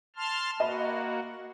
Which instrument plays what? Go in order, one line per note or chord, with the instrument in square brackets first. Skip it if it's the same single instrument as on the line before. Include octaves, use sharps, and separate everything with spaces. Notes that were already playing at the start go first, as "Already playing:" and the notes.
[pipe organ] A5 C6 F6
[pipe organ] A#3 F#4 [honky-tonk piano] D#5 B5